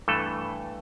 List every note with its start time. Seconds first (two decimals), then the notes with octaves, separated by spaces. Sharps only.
0.08 G2 E3 A3 A4